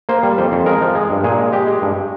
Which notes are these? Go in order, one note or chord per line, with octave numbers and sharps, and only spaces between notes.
A#3 C5
G3
F2 C5
F2
G#3 A#4
F3
G#3
G2
A#2 G#4
G#3
G#3 G4
G#3
G2